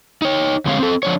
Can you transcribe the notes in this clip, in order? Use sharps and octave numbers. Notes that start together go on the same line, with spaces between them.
D#4 C#5
F2 D3 G#3 C4 C#5 F5
C4 A4
F3 D4 C#5